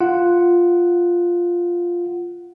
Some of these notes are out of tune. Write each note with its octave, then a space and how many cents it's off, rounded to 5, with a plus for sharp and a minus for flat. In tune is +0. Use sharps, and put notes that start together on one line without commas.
F4 +0 F#5 +0